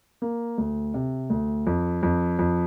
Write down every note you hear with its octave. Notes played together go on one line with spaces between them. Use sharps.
A#3
D2
C3
D2
F2
F2
F2